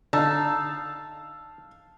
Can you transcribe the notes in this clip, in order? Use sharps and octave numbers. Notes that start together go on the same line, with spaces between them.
D3 D#4 F5 A5 E6